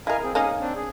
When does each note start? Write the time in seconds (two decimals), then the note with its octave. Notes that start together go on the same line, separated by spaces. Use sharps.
0.07 E4 A#4 D#5 F5 G#5
0.23 C4 G#4
0.35 A#3 C#4 D#4 G#4 D#6
0.60 C4 D4
0.75 G#4